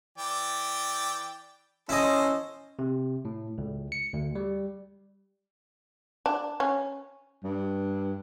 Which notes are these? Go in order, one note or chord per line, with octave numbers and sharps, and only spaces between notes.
E3 D5 G5
C#4 E4 A4 C5 D#5
C3
A2
C#2
C#7
D2
G3
D4
C#4
G2